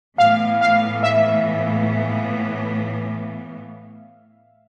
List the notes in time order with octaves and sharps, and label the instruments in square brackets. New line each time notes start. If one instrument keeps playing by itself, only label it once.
[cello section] A2 E3 B3 [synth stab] F5
[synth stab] F5
E5